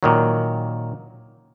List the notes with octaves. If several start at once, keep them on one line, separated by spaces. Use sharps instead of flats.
A#2 D#3 F#3